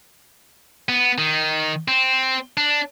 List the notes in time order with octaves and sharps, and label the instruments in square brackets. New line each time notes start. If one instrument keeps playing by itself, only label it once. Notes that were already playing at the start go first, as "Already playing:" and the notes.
[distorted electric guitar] B3
D#3
C4
D4